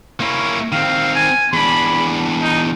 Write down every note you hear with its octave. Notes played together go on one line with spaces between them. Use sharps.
A#3 C#4 E4
D#3 C4 F5
G#5
E2 D4 B5
D#4